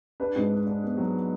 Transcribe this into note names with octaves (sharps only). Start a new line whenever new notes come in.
D4 B4
G#2
D4
D4
B3
F#3